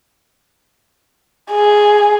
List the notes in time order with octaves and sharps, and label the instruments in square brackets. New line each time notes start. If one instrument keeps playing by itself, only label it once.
[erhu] G#4